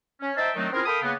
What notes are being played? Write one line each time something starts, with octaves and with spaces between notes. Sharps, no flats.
C#4
D#4 C5 E5 G5 A5
D#3 F#3 A3 C4 D4 D#4
C4 C#4 E4 F4 G#4 A#4
A4 A#4 F5 G5 B5 D#6
C#3 A#3 B3